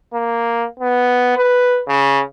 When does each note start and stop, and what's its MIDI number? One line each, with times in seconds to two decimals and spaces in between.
0.13 0.65 58
0.79 1.34 59
1.37 1.81 71
1.87 2.21 49